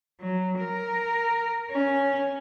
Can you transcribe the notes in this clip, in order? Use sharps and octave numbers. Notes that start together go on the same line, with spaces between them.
F#3
A#4
C#4